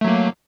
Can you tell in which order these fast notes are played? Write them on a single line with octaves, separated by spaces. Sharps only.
A3 F#3 A#3